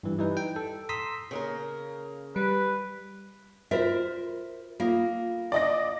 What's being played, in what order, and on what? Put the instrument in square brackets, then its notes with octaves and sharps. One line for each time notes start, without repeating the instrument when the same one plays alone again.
[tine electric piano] G2 E3 G3
E3 G3 D#4 B4
G5
A4
A#5 C6 D#6 E6 B6
[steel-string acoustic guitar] C#3 A#3 A#4
[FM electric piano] G3 [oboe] B4
[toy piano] F4 F#4 D#5 [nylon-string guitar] A#4 C5 E5
[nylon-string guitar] A#3 [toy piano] F4 A4
[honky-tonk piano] D5 D#5 A#6